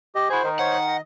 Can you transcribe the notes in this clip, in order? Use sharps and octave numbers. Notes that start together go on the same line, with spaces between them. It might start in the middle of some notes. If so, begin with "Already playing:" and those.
G4 D#5
E4 F#4 G#4 C5
D#3
C5 C#5 F#5
D#5